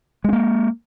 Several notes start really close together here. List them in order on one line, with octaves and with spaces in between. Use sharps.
G#3 C#4 A#3